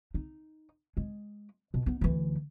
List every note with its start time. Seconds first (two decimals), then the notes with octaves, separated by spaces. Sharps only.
0.14 D#4
0.97 G#3
1.74 B2
1.86 B3 D#4
2.01 D2 E3